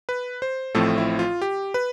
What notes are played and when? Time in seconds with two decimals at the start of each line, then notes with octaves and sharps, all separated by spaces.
0.09 B4
0.42 C5
0.74 A1 A2 F3 A3 C4 A4
0.98 E4
1.19 F4
1.42 G4
1.74 B4